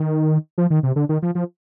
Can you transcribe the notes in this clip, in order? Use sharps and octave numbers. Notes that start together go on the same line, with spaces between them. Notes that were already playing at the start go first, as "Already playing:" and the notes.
Already playing: D#3
F3
D#3
C3
D3
D#3
F3
F3